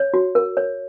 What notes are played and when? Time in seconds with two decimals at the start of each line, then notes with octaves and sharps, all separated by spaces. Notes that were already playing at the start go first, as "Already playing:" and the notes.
Already playing: C#5
0.14 F#4
0.35 A#4
0.57 C#5